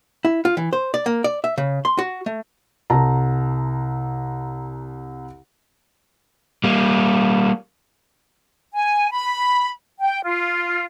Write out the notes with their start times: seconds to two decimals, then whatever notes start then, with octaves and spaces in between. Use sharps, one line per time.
0.25 E4
0.45 F4
0.57 E3
0.73 C5
0.94 D5
1.06 A#3
1.24 D5
1.44 E5
1.58 C#3
1.85 C6
1.99 F#4
2.26 A3
2.90 C2 A5 A#5
6.64 G3 A#3
8.74 G#5
9.11 B5
10.00 G5
10.24 F4